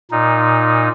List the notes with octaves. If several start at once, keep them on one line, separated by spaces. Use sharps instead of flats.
A#2 D#4